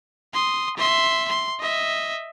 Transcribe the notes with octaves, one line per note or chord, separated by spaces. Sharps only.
C6 D#6
E5 C6
C6
D#5 E5